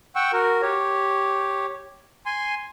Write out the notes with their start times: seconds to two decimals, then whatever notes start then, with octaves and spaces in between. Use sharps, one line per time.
0.16 F#5 G5 C#6 E6
0.33 F#4 A#4
0.62 G4 C#5
2.26 G#5 C6